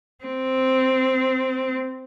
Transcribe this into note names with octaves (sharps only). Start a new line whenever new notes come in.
C4